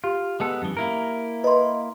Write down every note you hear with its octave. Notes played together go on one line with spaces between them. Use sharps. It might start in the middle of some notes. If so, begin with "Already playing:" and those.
F4 G4
G#3 B3 A4
F#2 E3
A#3 E4 A#4
B4 D#5 C6